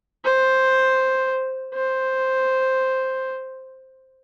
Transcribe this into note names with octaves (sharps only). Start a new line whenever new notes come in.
C5
C5